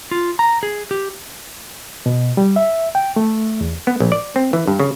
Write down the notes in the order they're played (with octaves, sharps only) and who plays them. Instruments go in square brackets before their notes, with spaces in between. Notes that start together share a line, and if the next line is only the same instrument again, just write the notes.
[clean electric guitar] F4
A#5
G#4
G4
[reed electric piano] B2
G3
E5
G5
A3
E2
[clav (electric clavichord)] B3
A#1
D5
C4
E3
G2
C#3